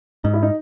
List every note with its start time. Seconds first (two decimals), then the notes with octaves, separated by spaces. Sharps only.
0.24 G#2 D#4
0.34 E4
0.42 D#4